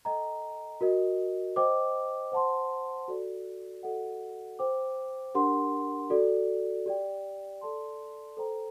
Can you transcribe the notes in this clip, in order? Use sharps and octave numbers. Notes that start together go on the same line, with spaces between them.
A4 D#5 G5 A#5
F#4 A#4 D#5
C5 D#5 G5 D6
C5 F#5 A5 C6
F#4 A4 D5
F#4 A4 D#5 F#5
C5 G5 D6
D4 G4 A#4 F#5 C6
F#4 A4 D5
G4 D5 G5
A4 D5 A5 C6
A4 C5 G5 A#5